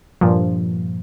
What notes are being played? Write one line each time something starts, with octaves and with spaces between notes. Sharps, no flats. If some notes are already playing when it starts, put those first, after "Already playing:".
G2 A#2 F3